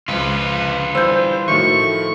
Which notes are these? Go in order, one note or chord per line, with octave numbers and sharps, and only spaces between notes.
C#2 F3 F4 B4
E3 G3 C5 E6 G6
A2 D#3 F3 A3 F#4 E5 C#6